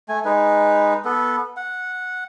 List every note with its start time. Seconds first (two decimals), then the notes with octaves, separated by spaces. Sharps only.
0.09 A3 G#5
0.25 G#3 D#4 B4
1.05 B3 A4 B4
1.57 F#5